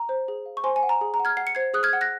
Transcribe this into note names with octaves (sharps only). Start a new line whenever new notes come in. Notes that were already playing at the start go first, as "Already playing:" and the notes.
Already playing: A#5
C5
G#4
F5
C#6
C5 G#5 C6
G#5
F#5
A#5
G#4
A#5
F#5
F6 G#6
F#5 C7
C#7
C5 G#6 C7
G#4 D#6 F#6
F6 G#6
F#5
F#6 A#6